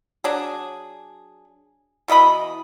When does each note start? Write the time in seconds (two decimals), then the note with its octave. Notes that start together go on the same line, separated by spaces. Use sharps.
0.24 F#3 D4 G#4
2.08 B2 E3 D#5 B5